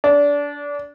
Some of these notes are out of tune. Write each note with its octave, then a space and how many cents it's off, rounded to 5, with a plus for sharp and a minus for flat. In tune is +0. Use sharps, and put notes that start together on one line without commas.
D4 -25